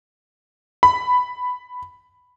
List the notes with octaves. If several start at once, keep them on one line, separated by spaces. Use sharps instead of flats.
B5